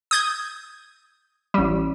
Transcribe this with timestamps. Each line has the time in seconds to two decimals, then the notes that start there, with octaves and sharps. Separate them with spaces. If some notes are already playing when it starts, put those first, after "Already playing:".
0.11 D#6 G6 G#6
1.54 A1 G3